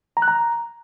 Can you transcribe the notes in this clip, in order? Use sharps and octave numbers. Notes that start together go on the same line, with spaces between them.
A#5
F#6
A#5